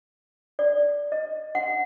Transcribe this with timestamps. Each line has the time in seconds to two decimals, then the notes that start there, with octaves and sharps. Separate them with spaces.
0.59 D5
1.12 D#5
1.55 F#5